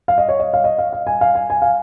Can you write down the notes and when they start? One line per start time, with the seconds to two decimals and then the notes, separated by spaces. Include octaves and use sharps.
0.08 F5
0.18 D#5
0.29 C#5
0.40 D#5
0.54 F5
0.64 D#5
0.78 F5
0.93 F5
1.07 G#5
1.21 F5
1.35 G#5
1.50 G#5
1.62 F5